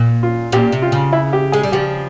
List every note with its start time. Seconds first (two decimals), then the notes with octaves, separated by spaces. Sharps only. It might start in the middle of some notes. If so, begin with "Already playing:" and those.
Already playing: A#2
0.23 F4
0.52 A#2 G4
0.72 C3
0.82 F4
0.92 C#3
1.13 E4
1.33 G4
1.52 G#3 G#4
1.63 G3
1.72 C#3 F3 G4